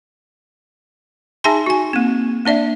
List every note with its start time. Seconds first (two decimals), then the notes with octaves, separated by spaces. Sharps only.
1.44 D#4 G#4 E5 G#5 A5 C6
1.66 F#4 G#5
1.93 A#3 C4
2.45 A#3 D4 D5 E5